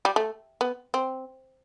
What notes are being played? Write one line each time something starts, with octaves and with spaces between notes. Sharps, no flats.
G3
A3
B3
C4